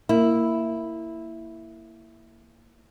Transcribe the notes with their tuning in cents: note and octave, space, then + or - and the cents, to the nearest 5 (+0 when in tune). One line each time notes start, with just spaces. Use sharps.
A#3 -15 E4 +0